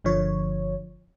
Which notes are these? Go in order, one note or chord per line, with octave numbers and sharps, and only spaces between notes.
G1 D3 F3 C#5